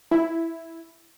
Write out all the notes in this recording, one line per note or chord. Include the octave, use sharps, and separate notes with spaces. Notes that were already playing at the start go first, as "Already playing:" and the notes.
E4